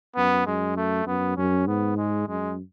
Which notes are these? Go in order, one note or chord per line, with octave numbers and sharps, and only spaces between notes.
F#2 B3
F#2 G#3
A3
F#2 B3
F#2 C#4
G#2 B3
G#3
F#2 G#3